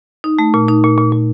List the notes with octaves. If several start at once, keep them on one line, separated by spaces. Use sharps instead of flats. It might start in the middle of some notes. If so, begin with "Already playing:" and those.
D#4
A3
A#2
D#4
A#2
A#2
A#2